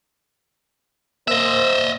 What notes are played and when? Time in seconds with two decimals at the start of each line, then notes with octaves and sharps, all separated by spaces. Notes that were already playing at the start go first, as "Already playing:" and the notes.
1.28 A#3 C5 D#5 E5